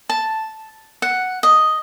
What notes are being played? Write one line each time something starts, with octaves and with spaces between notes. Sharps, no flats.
A5
F#5
D#5